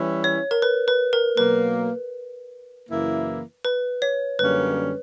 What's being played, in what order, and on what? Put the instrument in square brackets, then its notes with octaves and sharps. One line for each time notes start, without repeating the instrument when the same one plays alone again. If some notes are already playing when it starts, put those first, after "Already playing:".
Already playing: [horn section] E3 G3 C#4 E4 B4
[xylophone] C#5
A#4
B4
B4
A#4
[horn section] B2 F#3 A#3 [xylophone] B4
[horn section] F#2 C#3 E3 A#3 E4
[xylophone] B4
C#5
[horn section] F#2 D3 G3 A#3 C#4 [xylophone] B4